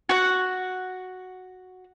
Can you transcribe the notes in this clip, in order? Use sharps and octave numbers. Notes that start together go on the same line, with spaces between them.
F#4 F#5